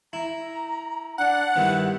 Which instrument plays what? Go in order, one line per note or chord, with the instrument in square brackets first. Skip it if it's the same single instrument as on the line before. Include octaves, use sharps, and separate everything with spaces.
[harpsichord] E4 [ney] A#5
[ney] D4 [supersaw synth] F#5
[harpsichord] G2 D#3 B3 [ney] E4